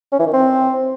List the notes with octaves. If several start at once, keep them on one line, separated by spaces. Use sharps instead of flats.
C#4
E3
D#3
C4